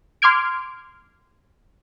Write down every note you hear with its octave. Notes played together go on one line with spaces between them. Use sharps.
C6 D6 F6 G#6 D7